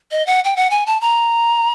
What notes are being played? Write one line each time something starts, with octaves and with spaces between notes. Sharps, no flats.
D#5
F#5
G5
F#5
G#5
A5
A#5